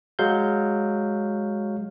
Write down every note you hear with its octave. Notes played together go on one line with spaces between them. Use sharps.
F#3 G#3 F5 G6